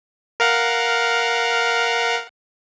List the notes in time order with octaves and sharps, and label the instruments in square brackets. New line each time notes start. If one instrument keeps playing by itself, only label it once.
[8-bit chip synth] A#4 F5 F#5